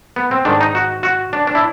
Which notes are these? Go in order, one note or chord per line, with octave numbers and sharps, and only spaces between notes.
B3
C4
G#2 D#3 D4
D#4
F#4
F#4
D4
D4
E4